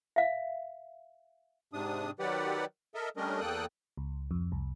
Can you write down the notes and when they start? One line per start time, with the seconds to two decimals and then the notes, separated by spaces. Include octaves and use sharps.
0.16 E5 F5
1.73 G#2 C3 D4 D#6
2.19 D#3 F#3 G4 B4 D5 F#5
2.95 A4 A#4 D#5 E5
3.17 G3 A3 C#4 D4 A#4 D#5
3.41 E2 A#3 A4 G5 D#6 F#6
3.97 C#2
4.31 F2
4.52 C2